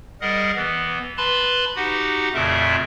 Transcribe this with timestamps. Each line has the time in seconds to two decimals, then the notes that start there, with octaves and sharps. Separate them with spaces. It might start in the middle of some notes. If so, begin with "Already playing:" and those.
0.21 G3 G#4 A#4 D#5 F#5
0.56 E3 B3
1.17 B4 A5 B5 C6
1.76 D#4 F#4 G4 F#5
2.34 F2 A#2 C#3 A3 A#4 E5